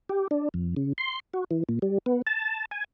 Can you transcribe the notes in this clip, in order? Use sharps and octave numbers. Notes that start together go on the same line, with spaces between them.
G4
D4
F2
C#3
C6
F#4
E3
A#2
G3
B3
A5
G#5